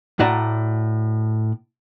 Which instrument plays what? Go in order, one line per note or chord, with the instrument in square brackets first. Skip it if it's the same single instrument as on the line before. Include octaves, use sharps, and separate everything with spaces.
[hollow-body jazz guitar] A2 F#4 D5 A5 A#5